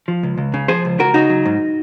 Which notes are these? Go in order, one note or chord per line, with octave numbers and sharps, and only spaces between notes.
F3
C#2
C#2
C#3
F3 G#4 C5
C#2
C#2 F#4 A#4
C#3 D#4 F#4
F#3
G#2